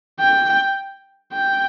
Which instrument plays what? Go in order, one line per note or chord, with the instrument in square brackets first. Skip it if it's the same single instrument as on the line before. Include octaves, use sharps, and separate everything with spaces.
[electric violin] G5
G5